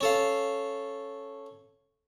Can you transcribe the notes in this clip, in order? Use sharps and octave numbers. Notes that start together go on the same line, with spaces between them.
C#4 A4 F5